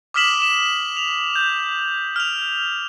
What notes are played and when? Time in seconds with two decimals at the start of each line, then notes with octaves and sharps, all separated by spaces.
0.14 D6 D#6 F6 B6 E7 F#7
0.42 E7
0.97 F7
1.36 G6
2.16 F6 F7